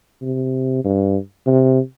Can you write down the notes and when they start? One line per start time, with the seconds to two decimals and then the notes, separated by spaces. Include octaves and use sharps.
0.22 C3
0.84 G2
1.46 C3